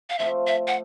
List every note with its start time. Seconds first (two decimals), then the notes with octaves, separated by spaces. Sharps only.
0.10 F5
0.19 F3 A3 C4 F4 E5
0.47 E5
0.67 F#5